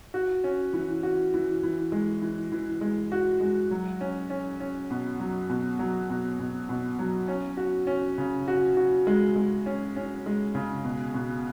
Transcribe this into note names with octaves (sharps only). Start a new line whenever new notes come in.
F#4
C#4
E3
F#4
E3
E3
G#3
E3
E3
G#3
F#4
G#3
F#3
C#4
C#4
C#4
B2
F#3
B2
F#3
B2
B2
B2
F#3
C#4
F#4
C#4
C#3
F#4
F#4
G#3
G#3
C#4
C#4
G#3
C#3
B2
B2